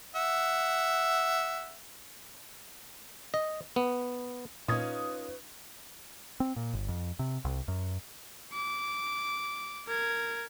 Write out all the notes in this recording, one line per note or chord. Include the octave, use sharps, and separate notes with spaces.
E5 F#5
D#5
B3
A#2 C#4 D#4 F4 B4 D#6 G#6
C4
A#2
G1
F2
C3
C2
F#2
D6
A#4 G#6